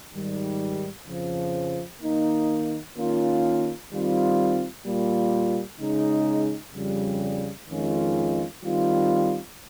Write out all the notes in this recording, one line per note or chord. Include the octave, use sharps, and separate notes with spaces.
G#2 D#3 G3
F2 C#3 F3
D#3 A#3 D#4
D#3 A#3 C#4 F4
D#3 G3 C4 F4
A#2 G3 A#3 F4
C#3 G#3 D#4
F2 C#3 G3
F2 D#3 G#3 C#4 F4
D#3 G3 C4 F4